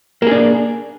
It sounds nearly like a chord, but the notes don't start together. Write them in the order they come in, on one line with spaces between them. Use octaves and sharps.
A#3 G#4 D4